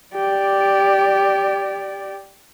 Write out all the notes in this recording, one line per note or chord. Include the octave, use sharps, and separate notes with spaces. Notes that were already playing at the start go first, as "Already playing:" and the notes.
G4 D5